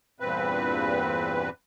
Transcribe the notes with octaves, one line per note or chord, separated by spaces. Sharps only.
E2 G2 A#2 C4 B4